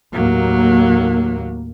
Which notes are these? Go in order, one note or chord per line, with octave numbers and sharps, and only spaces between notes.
D#2 A2 F#3 A#3